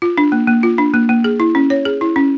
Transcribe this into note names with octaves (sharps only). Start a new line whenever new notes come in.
F4
D4
A#3
A#3
F4
D4
A#3
A#3
G#4
E4
C#4
C#5
G#4
E4
C#4